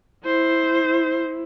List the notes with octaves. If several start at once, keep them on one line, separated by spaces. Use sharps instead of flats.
E4 C5